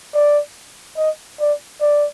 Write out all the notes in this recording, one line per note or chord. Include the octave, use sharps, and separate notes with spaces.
D5
D#5
D5
D5